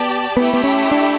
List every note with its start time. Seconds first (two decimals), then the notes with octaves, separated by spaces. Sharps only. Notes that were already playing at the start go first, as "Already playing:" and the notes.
Already playing: B3 G4 D5 A5
0.37 A3 B3 E4 G4
0.54 B3
0.64 C#4
0.91 D4